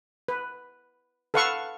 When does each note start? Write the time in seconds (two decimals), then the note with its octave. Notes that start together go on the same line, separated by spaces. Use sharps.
0.28 B4
1.34 A4 B4 F5 F#5 C#6